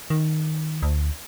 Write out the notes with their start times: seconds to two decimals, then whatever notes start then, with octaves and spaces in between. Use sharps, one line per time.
0.10 D#3
0.82 D2